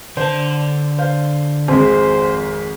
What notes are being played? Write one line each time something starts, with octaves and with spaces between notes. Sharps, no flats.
D3 C5 A5
C5 F5
G#1 F2 G#3 C5